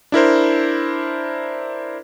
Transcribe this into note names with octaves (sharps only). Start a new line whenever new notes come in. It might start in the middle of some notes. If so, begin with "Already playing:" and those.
D4 E4 A#4 C5